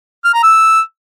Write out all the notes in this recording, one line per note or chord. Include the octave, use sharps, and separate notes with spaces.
F6
A#5
E6